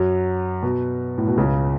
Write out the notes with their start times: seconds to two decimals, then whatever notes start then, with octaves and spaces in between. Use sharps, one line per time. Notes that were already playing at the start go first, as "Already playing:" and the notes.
Already playing: F#2 F#3
0.63 B2
1.18 A2
1.28 B2
1.37 C#2 C#3